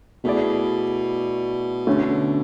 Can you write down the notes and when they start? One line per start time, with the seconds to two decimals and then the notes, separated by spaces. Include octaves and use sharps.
0.24 B2 A3 E4 G#4 D5
1.87 D3 A3 C#4